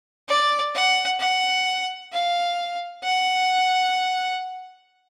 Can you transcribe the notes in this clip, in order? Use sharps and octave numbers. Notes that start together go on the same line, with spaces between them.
D5
F#5
F#5
F5
F#5